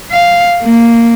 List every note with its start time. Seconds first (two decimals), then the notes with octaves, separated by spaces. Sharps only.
0.11 F5
0.63 A#3